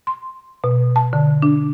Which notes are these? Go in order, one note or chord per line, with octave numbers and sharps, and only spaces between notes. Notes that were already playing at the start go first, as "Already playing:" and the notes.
C6
B2
A5
D3
D4